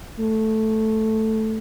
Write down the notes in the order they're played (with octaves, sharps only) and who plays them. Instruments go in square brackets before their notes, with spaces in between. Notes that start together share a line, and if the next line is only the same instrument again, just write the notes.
[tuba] A3